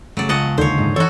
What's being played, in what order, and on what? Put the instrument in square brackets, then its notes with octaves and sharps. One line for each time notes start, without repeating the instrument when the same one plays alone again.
[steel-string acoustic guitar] C#3 A3 [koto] F#3 D5
[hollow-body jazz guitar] C#2 [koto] D#5 F#5 A5
[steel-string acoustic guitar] B3
[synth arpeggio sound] D#2 D3 D#3 [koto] C5 C#5
[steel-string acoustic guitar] G#2 D#4
[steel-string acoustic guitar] E3 D4 D#4 [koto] F#4 A4 [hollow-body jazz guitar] C#5